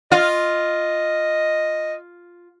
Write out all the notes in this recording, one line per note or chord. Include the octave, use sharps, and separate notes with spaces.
F4 D#5